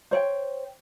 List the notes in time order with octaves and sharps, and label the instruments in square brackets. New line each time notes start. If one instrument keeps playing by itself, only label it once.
[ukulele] C5 C#5 G5